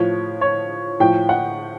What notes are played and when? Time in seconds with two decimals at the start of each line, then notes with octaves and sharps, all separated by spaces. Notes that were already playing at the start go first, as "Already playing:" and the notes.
Already playing: A2 F3 C#5
0.41 C#5
1.00 A2 F3 G5
1.29 F#5